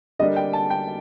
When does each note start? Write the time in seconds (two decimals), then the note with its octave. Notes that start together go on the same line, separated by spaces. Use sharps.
0.19 D3 G3 A#3 D4 D#5
0.36 G5
0.53 A5
0.70 G5